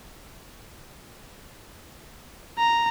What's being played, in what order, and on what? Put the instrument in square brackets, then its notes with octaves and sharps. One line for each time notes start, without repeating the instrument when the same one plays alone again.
[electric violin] A#5